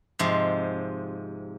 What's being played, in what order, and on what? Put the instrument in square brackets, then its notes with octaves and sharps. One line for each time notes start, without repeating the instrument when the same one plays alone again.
[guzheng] G#2 C3 F3